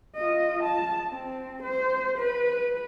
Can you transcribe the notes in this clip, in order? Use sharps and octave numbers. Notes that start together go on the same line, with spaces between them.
F4 D#5
A5
C4
C5
B4